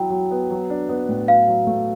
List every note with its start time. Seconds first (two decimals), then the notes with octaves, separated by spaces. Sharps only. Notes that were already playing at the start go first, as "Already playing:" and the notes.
Already playing: F#3 E4 G5
0.10 F#3
0.31 B3
0.51 F#3
0.70 D4
0.89 B3
1.09 A2
1.28 F#3 F5
1.48 F#3
1.67 A3